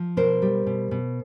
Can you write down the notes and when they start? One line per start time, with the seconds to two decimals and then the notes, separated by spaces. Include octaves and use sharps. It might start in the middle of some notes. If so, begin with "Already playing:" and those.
Already playing: F3
0.17 B2 A#4 C5
0.42 G3
0.67 B2
0.91 B2